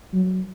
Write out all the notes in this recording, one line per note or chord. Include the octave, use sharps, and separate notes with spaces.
F#3